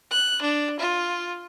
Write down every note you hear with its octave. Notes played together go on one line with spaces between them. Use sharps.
F#6
D4
F4